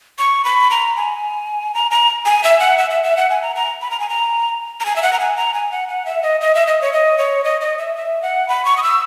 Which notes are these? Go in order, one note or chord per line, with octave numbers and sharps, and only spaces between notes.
C#6
B5
A#5
G#5
A#5
A#5
G#5
E5
F#5
E5
E5
E5
F#5
G#5
A#5
A#5
B5
A#5
G#5
A#5
A#5
G#5
E5
F#5
A#5
G#5
A#5
G#5
F#5
F#5
E5
D#5
D#5
E5
D#5
C#5
D#5
C#5
D#5
D#5
E5
E5
F#5
B5
C#6
D#6
E6